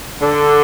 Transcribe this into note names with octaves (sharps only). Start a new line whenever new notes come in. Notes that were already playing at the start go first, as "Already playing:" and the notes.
D3